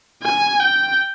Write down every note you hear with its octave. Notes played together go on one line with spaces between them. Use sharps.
G#5
G5